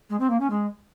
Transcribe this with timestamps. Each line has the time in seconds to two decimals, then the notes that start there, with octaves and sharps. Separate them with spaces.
0.10 G#3
0.20 C4
0.30 A#3
0.40 C#4
0.50 G#3